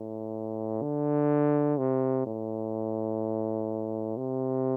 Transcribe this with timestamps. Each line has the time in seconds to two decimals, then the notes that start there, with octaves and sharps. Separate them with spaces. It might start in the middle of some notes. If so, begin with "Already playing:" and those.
Already playing: A2
0.82 D3
1.78 C3
2.26 A2
4.17 C3